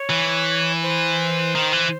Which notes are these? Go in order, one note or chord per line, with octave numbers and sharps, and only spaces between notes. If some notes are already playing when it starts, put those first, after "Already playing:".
Already playing: C#5
E3
C5
D#3
E3